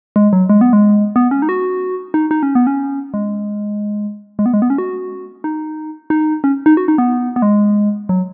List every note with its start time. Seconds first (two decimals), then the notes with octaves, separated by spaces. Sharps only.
0.16 G#3
0.33 F#3
0.49 G#3
0.61 B3
0.73 G#3
1.16 B3
1.31 C#4
1.42 D#4
1.49 F#4
2.14 D#4
2.31 D#4
2.43 C#4
2.55 B3
2.67 C#4
3.14 G#3
4.39 G#3
4.46 B3
4.54 G#3
4.62 B3
4.70 C#4
4.78 F#4
5.44 D#4
6.10 D#4
6.44 C#4
6.66 D#4
6.77 F#4
6.88 D#4
6.98 B3
7.36 B3
7.42 G#3
8.09 F#3